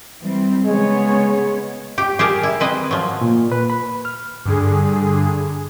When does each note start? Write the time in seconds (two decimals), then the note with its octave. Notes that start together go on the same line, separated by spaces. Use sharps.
0.20 E3 G3 C4
0.65 C#3 G#3 B3 C#5
1.98 G4 G5
2.19 G4 G#4 A#4 A5
2.43 E4
2.60 C4 B4 D#5
2.91 F3 F#3
3.21 A#2
3.52 B4
3.70 B5
4.05 F6
4.45 G2 D3 G#4